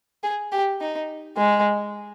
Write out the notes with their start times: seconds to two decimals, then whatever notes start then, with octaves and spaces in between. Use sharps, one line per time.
0.24 G#4
0.52 G4
0.81 D#4
1.37 G#3